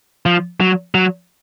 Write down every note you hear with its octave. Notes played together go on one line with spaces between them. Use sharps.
F3
F#3
F#3